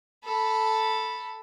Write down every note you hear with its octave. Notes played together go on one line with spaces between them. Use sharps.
A4 B5